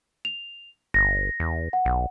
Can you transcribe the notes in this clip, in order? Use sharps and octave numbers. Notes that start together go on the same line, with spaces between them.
F7
G1 A#6
E2
F#5
B1